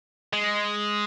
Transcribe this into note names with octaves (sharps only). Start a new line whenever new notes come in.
G#3